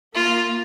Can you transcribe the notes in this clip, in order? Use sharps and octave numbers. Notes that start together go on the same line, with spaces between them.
A#3 F4